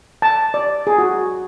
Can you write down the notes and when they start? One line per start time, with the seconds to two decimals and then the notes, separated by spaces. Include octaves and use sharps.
0.22 A5
0.54 D5
0.87 G#4
0.98 F#4